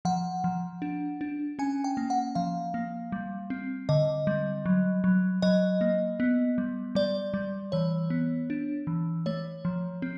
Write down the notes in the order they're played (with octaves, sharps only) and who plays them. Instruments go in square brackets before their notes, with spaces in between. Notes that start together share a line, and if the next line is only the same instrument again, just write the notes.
[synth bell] F3 F#5
F3
D4
D4
C#4 G#5
G5
A#3
F#5
F3 F5
A#3
G3
C4
D3 D#5
G3
F#3
F#3
F#3 D#5
A#3
B3
G3
G3 D5
G3
E3 C#5
B3
D4
E3
A3 C#5
F3
C4